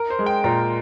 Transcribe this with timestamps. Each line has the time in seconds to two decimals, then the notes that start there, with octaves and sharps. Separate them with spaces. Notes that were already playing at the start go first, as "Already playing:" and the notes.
Already playing: A#4
0.10 C5
0.19 G#3
0.26 G5
0.44 A#2 A#5